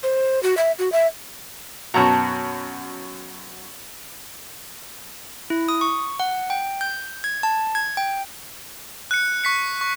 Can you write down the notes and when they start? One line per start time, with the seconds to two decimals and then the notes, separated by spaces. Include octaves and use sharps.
0.03 C5
0.43 F#4
0.57 E5
0.79 F#4
0.92 E5
1.94 F#2 B2 F#4 A5 A#5
5.50 E4
5.68 D#6
5.81 C#6
6.20 F#5
6.50 G5
6.81 G6
7.24 G#6
7.43 A5
7.75 G#6
7.97 G5
9.11 F#6 C#7
9.44 C#6 B6 C#7
9.81 C#6